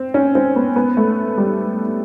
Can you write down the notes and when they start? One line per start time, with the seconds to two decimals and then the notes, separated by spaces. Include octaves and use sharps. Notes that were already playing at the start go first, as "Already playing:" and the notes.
Already playing: C4
0.14 C#4
0.35 C4
0.56 B3
0.76 B3
0.97 A3
1.37 G3